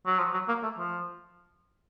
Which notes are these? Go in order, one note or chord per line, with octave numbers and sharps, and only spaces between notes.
F#3
F3
F#3
A#3
A3
F3